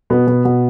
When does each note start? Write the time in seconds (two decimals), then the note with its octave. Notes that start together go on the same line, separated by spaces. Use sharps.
0.10 B2 B3
0.27 B2
0.45 B2